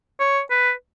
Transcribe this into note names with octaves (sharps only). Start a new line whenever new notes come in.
C#5
B4